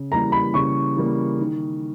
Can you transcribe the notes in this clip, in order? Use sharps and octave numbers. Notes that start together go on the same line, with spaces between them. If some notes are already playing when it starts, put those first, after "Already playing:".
Already playing: C#3
E3 G3 A#3 A#5
B5
C#3 C#6
E3 G3 A#3
D#3